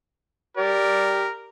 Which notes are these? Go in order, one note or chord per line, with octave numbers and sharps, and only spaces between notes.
G4 A#4 D5